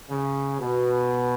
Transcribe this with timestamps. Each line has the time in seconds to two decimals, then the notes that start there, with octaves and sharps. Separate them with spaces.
0.10 C#3
0.60 B2